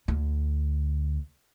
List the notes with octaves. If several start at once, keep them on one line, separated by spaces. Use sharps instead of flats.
D2 D3